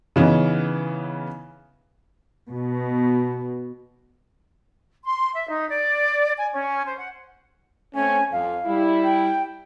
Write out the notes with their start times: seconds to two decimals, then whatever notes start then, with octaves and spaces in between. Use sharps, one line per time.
0.16 C#3 E3 B3 C#4 D#4
2.50 B2
5.04 C6
5.35 E5
5.48 D#4
5.68 D5
6.37 G#5
6.53 C#4
6.85 C5
6.98 F#5
7.94 A3 C4 C#4 G#5
8.32 F2 F5
8.66 G3 E4
9.03 G5